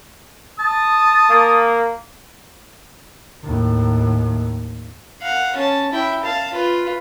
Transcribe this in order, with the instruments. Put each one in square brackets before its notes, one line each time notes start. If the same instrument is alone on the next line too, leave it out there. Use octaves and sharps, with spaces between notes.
[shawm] A5 [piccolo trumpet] D#6
[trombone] A#3
[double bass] D#2 A2
[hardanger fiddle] F5 F#5
C#4 A5
E4 G5
F5 A5
F4 B4